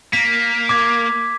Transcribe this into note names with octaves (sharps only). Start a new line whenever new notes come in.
A#3 B6
D6 G#6